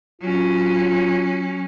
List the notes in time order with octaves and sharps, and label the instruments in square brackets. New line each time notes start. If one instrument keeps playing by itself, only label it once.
[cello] F#3 C#4 [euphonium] F4